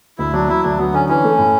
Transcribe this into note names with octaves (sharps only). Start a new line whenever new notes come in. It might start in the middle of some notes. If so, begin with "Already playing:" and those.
D2 E4
F#3 D4
F#3 E4
D2 D4
F#3 B3
D3 C#4
E3 C#4
A3
A2